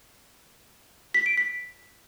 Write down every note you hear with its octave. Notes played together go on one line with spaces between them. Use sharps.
B6
D7
B6